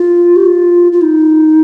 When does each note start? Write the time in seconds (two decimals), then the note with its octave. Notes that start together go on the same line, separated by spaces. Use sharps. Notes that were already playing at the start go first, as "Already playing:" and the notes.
Already playing: F4
0.36 G4
0.46 F4
0.92 F4
1.01 D#4